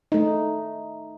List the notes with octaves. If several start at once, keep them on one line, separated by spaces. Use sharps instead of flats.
A3 D#4